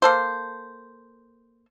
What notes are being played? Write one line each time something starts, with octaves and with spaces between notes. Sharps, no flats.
A#3 A4 C5